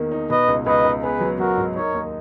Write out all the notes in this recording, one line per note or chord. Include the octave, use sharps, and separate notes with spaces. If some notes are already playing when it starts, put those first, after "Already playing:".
Already playing: E2 D#3 A#3
D#4
B2 B4 D#5
C#2
C#2 B4 D#5
C#2
B3 G#4 B4
F#3
F#3 F#4 A#4
G#2
D#4 A#4 C#5
D#2